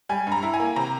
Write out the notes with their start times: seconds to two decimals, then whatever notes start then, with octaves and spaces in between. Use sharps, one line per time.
0.09 G3 G#5
0.27 G2 A#5
0.43 E4
0.54 G#5
0.60 A#3
0.76 C3 A#5